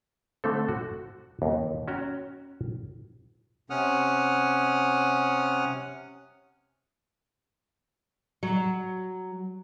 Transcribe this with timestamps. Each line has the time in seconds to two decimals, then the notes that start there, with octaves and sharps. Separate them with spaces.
0.44 D3 A3 C4 A4
0.68 F#4
1.42 D#2
1.88 C#4 F#4 G5 A#5
3.70 C3 C#4 F#5 D#6 F6
8.43 F#3